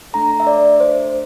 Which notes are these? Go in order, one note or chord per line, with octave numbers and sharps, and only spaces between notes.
A3 D4 A4 A#5
E5
D5
C5